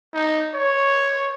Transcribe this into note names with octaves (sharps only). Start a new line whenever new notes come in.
D#4
C#5